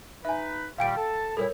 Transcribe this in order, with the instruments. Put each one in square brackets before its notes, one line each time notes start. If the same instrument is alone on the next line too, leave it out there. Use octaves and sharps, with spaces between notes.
[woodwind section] D#4 B4 [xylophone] E5 G#5
[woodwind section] A#2 D#3 G3 [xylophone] F5 G5 D7
[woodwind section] A4 A5
[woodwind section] A#2 G3 E4 [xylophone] A4 A#4 C#5